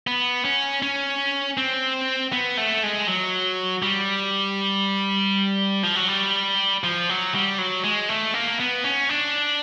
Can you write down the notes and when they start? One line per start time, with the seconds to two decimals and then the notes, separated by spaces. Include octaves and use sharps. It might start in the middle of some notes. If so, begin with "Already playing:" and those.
0.07 B3
0.45 C#4
0.82 C#4
1.58 C4
2.32 B3
2.57 A3
2.83 G#3
3.08 F#3
3.82 G3
5.83 F3
5.96 F#3
6.08 G3
6.84 F3
7.09 F#3
7.35 G3
7.58 F#3
7.84 G#3
8.09 A3
8.34 A#3
8.60 B3
8.84 C#4
9.09 D4